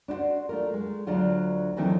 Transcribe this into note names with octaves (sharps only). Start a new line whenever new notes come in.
D4 E4 F#4 C5
A3 F4 A#4
G#3
D2 F#3 D4 F4
D2 D#3 E3 F#3 A3 C4